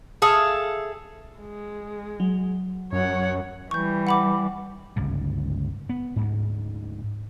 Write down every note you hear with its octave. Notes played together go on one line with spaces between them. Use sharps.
G#4 A4 E5 F5
G#3
F#3
F#2 C#5 F#5
E3 G3 C#6 G6
F#5 B5 D6
G1 C#2 G#2
B3
D2 G#2